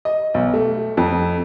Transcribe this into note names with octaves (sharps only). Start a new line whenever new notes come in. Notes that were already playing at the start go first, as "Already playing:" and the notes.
D#5
B1
A3
F2